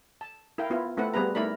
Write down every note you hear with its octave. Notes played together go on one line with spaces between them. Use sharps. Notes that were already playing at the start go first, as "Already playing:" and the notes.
A5
E4 A#4 F5 G5
B3 E4 F4
A3 C4 E4 A4 B4 F#5
G3 B3 C4 G#4 B4 A#5
A3 D#4 E4 A#4 D5 B5